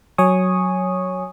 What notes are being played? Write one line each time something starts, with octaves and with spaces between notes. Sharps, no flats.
F#3 C#5 G#5 C#6 D#6